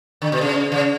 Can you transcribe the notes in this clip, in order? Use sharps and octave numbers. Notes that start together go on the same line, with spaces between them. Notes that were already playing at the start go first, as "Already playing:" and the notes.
D3
B2
C#3
C#3